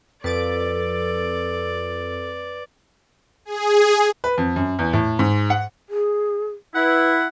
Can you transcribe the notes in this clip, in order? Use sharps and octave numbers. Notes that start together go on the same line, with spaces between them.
F2 A4 B4 D5 A6 D7
G#4
B4
F2
F#2
E2
A2
G#2
F#5
G#4
E4 B4 F#5